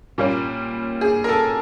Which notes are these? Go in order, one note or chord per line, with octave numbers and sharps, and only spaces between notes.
A#2 G3 A#3 C#4
G#4
A#4
A4